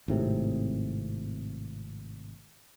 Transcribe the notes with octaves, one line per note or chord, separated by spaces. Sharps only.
G#1 A2 C3